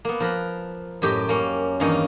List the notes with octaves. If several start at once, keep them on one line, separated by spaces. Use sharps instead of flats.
A#3 B3
F3 A#4 B4
F#2 A2 G4 D#5 G5
A#3 C#4
E2 G2 D#3 A#3 C#4 D#4